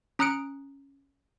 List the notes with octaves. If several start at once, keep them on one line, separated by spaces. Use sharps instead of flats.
C#4 A#5 D#6 F#6 C#7 D7